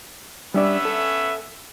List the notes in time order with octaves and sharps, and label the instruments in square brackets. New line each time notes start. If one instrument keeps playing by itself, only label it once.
[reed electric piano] G3 D4 D5 [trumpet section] B3 C#4 E5
[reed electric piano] A4